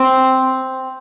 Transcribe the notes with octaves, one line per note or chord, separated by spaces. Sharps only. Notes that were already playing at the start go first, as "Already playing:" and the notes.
Already playing: C4